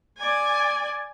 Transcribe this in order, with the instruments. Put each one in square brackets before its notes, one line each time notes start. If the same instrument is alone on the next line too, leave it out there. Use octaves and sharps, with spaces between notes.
[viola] D5 G#5